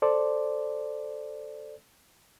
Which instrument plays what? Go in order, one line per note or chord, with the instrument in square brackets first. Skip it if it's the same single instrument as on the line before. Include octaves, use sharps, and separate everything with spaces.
[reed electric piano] A4 C5 D5